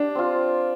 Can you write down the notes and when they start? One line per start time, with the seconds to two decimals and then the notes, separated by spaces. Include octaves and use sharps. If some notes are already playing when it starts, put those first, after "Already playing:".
Already playing: D4 G4
0.15 C4 F4